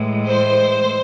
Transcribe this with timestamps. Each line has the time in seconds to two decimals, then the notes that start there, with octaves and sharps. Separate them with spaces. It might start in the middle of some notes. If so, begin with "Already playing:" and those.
Already playing: A2 E3 G#3
0.27 C5